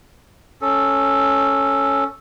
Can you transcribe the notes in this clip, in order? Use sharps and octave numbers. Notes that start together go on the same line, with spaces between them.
C#4 A4